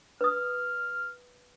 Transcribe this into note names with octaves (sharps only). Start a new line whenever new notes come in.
B4 D#6 F6